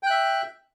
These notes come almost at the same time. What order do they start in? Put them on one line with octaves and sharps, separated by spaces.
G5 F#6 E5